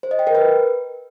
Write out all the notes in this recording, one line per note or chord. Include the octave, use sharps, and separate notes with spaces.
C5
D#5
G5
A#4
B4